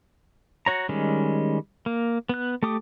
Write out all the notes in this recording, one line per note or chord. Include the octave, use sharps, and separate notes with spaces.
F#4 C#5 A#5
D#3 G3 G#3 C#4
A#3
B3 F#6
A3 G4 D6 D#6